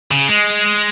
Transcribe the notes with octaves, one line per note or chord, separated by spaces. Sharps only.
C#3
G#3